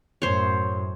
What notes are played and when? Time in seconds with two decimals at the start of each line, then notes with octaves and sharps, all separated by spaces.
0.22 F#2 A2 C5 C#5